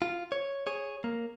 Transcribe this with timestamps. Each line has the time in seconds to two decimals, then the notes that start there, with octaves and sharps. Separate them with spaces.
0.02 F4
0.32 C#5
0.67 G#4 C#5
1.04 A#3